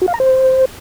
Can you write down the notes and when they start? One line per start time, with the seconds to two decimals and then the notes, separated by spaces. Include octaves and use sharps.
0.02 F#4
0.08 F5
0.14 A#5
0.20 C5